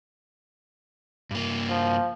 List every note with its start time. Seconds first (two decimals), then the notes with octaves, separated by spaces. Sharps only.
1.31 G2 A#3
1.70 F3